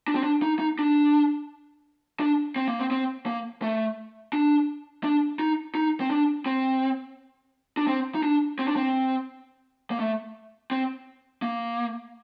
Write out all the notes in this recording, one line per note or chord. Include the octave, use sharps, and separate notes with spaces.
D4
C4
D4
D#4
D#4
D4
D4
C4
A#3
C4
C4
A#3
A3
D4
D4
D#4
D#4
C4
D4
C4
D4
C4
D#4
D4
C4
D4
C4
A#3
A3
C4
A#3